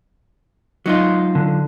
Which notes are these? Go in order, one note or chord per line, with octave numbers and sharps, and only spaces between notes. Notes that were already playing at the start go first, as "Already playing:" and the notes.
F#3 D#4 F4
D3